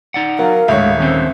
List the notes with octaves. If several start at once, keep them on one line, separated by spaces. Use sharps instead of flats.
D#4 D5 F#5
F#3 A#4 F5
D#1 A2 D3 G#3 C#5 E5
D#3 C4 C#4 C5